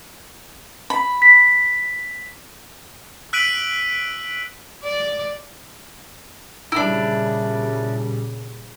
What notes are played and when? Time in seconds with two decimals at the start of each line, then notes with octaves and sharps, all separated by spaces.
0.90 B5
1.22 B6
3.33 E6 F#6 B6 D7 D#7 F#7
4.84 D5
6.72 A#2 C#3 G3 D4 E4